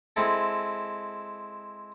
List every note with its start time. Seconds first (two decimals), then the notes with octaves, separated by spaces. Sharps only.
0.16 G#3 C4 E4 A4